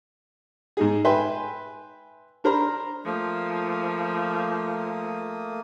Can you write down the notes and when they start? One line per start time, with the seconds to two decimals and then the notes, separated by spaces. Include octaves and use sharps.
0.77 G#2 D#4 G#4
1.05 B4 E5 G5 G#5 B5 C6
2.44 D4 A#4 C5 A#5 B5
3.05 F3 A3 A#3 D#6